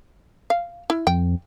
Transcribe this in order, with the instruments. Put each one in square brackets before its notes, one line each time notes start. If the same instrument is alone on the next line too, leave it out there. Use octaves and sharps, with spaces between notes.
[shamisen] F5
E4
[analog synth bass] F2 [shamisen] G5